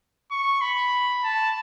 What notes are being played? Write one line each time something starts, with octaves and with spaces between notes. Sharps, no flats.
C#6
B5
A5